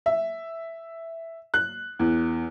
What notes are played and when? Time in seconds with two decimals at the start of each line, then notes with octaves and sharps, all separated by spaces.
0.06 E5
1.54 F#6
1.99 E2